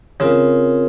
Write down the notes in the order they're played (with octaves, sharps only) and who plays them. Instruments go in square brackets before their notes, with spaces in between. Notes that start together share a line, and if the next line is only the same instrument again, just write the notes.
[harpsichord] C#3 [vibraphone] C4 F4 A#4